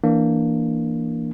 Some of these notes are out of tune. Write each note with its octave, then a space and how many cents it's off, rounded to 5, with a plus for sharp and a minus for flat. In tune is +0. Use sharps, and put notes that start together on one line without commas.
E3 +0 A#3 -5 D4 +0